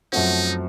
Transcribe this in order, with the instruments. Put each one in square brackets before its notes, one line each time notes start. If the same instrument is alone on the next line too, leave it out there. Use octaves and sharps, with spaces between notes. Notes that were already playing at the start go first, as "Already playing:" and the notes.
[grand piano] F#2 F3 A3 C4 F#4 [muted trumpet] D#4